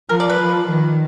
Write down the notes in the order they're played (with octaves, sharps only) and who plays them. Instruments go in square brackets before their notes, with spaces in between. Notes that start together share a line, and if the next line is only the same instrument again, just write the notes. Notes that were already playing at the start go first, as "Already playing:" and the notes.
[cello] F3 [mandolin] A#4
[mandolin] D5
B4
[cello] F3
D#3